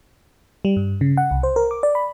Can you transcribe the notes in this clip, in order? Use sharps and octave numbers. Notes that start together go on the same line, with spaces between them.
G3
G2
C#3
F#5
C2
C5
A#4
D6
D5
B5